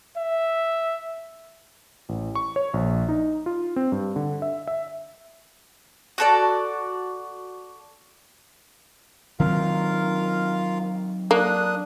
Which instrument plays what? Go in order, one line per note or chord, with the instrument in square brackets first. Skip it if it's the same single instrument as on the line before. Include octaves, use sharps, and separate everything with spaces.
[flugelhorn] E5
[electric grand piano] A1
C#6
C#5
A#1
D#4
F4
C4
G2
D3
E5
E5
[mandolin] F#4 A4 D5
[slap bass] D#3 F#3 C4 [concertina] F4 A#4 F5
[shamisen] A#3 [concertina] D4 D#6 F#6